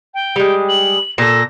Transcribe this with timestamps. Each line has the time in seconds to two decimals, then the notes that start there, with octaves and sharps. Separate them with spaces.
0.14 G5
0.36 G3 G#3
0.69 F#7
1.18 A#2 A4 A#6